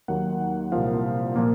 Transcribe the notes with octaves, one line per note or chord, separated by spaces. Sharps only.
D#2 D#3 F#3 A#3 F#5
C2 A#2 F3 A#3 F5
A#2 F3 A#3